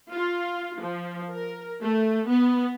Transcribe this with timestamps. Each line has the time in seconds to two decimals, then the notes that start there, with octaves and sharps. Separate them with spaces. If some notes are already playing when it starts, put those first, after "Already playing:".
0.11 F4
0.80 F3
1.32 A#4
1.83 A3
2.27 B3